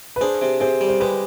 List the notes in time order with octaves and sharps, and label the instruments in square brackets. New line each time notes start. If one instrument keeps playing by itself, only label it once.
[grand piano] B4
[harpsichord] D4 [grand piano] G#4 C5
[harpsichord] C3
[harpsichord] C3 [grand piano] G#4 C5
[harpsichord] G3
[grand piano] C5
[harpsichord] G#3 [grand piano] G4 B4